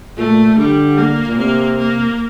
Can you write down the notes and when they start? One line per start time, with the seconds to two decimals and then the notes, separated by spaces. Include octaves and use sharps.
0.18 A#2 A3
0.57 D3 G3
0.98 A#3
1.28 A#2
1.38 C3 A#3
1.78 A#3